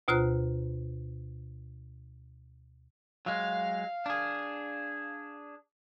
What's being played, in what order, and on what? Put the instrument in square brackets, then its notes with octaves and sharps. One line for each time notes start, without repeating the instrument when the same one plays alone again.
[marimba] D2 B2 F4 C5 A#5 F#6
[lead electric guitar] F#3 G#3 [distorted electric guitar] F5
[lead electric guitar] D4 G#4